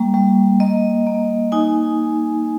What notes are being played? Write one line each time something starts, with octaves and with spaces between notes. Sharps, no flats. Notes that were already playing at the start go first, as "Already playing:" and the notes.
Already playing: G3 A#3
G3
A#3 D#5
A#3
D#4 G#5